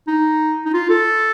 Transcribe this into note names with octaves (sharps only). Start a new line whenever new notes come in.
D#4
D#4
F4
A4